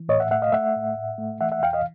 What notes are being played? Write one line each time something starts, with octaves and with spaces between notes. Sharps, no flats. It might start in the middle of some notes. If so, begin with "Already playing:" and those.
Already playing: E3
A2 C#5 D#5
E5 F#5
A3 E5 F#5
D#5 F5
A3 E5 F#5
A2
A2
A3
E3 E5 F#5
E5 F#5
E2 F5 G5
D#5 F5